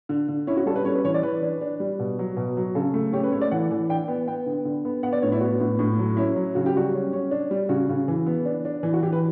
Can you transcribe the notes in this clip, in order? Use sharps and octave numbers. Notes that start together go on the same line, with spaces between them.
D3
D3
C#4 E4
F#4
G3 A4
B4
C#4 C#5
B4
E3 C#5
D5
E3 B4
D4
D4
G3
B2
F#3
B2
F#3
C#3 A4
A3
C#4 G4
B4
A3 C#5
D5
E3 F#5
E3
D4 G5
B3
B3 G5
D3
D3
B3
B3 F#5
D5
A2 C#5
E4
B3 F#4
A2
A2
F#3
C#4 E4
F#3
C#3 F#4
G4
G3 F#4
C#4
C#4
D4
G3
C#3 F#4
C#3
E3
B3
D4
D4
E3
F#4
E3 G4
B4